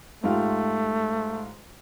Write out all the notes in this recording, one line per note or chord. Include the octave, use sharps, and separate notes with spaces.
G#2 A3 F4 G4